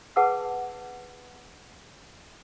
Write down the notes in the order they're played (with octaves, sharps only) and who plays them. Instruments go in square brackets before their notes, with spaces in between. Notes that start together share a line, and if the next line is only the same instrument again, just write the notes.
[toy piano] G#4 B4 F#5 A5 D6 E6